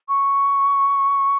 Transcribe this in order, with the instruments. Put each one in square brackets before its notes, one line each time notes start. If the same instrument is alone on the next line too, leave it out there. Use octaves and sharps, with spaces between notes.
[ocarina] C#6